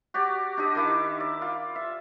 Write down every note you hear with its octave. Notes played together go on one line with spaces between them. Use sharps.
F#4 G4 D5
D4 D#4 G4 D#5
D#3 E4 D6
D5
F4
E5